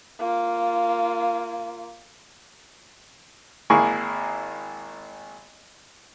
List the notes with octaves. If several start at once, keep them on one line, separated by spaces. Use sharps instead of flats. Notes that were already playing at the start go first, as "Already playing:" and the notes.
A#3 F4
G#1 A#3 E4 G#4 G#5 C#6